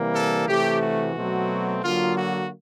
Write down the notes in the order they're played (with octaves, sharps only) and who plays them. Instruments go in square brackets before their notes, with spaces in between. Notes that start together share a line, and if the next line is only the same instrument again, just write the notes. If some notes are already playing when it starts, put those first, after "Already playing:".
Already playing: [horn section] C3 E3 G3 A#3
A4
C3 E3 A3 G4
F#4
B2 F#3 A3 C4
D3 F#3 A#3 F4
F#4